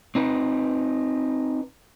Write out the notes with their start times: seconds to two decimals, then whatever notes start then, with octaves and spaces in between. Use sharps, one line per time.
0.15 C4 D#4 B4